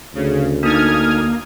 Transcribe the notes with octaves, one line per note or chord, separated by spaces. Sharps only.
D2 C#3
A#3 D4 D#4 D#6 F6 G#6